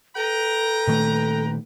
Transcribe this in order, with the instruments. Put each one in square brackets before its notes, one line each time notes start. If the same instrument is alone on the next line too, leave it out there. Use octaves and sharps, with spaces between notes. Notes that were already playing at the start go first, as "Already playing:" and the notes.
[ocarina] A4 [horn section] B4 G5 A#5
[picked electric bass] A#2 D#3 A3